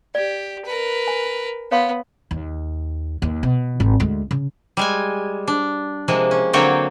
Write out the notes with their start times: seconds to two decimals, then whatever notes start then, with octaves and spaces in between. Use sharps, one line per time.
0.15 G4 D5
0.65 A#4 B4
1.08 G#5
1.71 B3 C#5 F5 C6
2.31 D#2
3.22 D#2
3.43 B2
3.80 G#1
4.00 D2 G#3
4.31 C#3
4.77 G3 G#3 G#5
5.48 D4
6.08 C3 F3 G#3 A#3
6.31 C#4
6.53 D3 F#3 A#3 C4 C#5 G5